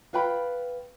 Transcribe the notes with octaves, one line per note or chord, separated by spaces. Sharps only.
F4 B4 G5 B5